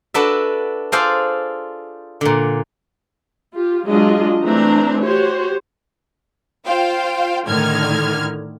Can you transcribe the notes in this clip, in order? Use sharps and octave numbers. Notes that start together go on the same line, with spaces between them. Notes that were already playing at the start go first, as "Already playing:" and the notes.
D4 F#4 A4 B4 D5 E5
F4 G#4 A4 C5 D5 F5
A#2 D3
F4 G4
F#3 G#3 D4 F4 G#4 D#5
E3 A3 C4 D4 A#5
F#4 G4 C5 C#5
F4 C5 F5 G5
A2 D3 D#3 F6 G#6